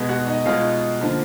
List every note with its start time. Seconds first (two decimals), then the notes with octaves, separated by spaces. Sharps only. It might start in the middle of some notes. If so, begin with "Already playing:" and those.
Already playing: B2 G#3 B3
0.09 F#4 F#5
0.27 D#4 D#5
0.46 B2 G#3 B3 F4 F5
1.00 D3 F3 A#3